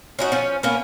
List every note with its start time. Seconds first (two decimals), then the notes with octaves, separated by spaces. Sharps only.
0.19 C#4 D#4 F#4
0.32 F3 C#4
0.63 A#3 B3 C#4